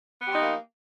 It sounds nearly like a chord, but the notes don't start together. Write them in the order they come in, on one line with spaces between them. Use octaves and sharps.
B3 G4 F3 D#4 A#3